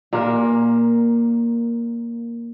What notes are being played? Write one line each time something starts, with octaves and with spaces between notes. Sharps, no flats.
A#2 A#3 A#4